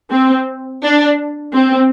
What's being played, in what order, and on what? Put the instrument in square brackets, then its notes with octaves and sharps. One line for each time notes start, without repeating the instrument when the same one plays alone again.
[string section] C4
D4
C4